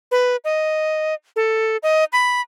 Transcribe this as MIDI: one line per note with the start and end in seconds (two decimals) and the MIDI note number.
0.11 0.36 71
0.44 1.14 75
1.36 1.77 69
1.83 2.04 75
2.13 2.41 83